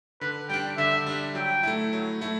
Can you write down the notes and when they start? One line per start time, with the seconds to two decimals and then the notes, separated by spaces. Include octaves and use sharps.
0.21 D3 B4
0.49 G3 D4 G5
0.78 D3 E5
1.06 G3 D4
1.35 F#3 G5
1.63 A3 E4
1.93 F#3
2.21 A3 E4